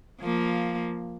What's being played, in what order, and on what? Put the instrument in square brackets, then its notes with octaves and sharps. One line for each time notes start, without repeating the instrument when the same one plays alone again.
[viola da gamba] F3 A#3